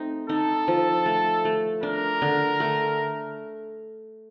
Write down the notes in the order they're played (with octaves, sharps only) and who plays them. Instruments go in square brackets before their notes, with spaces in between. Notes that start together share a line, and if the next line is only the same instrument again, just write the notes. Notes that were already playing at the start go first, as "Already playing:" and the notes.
Already playing: [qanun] A3 C4 D#4
[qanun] D#4 [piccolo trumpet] A4
[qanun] F3
A3
A3
[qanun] D4 [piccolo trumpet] A#4
[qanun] D3
A3